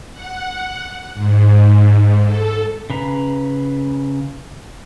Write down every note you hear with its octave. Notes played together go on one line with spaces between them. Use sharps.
F#5
G#2
A4
C#3 B4 A#5